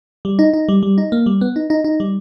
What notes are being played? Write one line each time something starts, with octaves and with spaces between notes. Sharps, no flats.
G3
D#4
D#4
G3
G3
D#4
A#3
G3
B3
D#4
D#4
D#4
G3